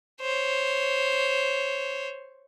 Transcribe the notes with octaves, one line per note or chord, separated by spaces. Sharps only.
C5 C#5